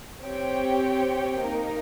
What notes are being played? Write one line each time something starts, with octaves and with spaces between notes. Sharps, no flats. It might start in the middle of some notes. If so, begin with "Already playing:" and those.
C4 G4 C#5 G5
A#3 D#4 A#4